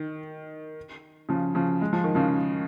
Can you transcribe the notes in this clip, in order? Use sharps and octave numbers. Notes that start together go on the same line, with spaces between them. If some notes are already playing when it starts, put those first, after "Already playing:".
Already playing: D#3
C#3 F3
C#3 F3
G#3
F3
D#3
C#3 F3